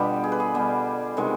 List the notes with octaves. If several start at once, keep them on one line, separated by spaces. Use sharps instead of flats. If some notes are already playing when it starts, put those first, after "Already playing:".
Already playing: B2 D3 G3 B3 F4 G4
G#4
B4
G#4
B2 G3 B3
C3 D#3 G#3 B3